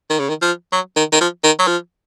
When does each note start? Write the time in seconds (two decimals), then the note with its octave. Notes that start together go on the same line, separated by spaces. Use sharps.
0.10 D#3
0.19 C#3
0.29 D#3
0.42 F3
0.72 F#3
0.96 D#3
1.12 D#3
1.21 F3
1.44 D#3
1.59 F#3
1.67 F3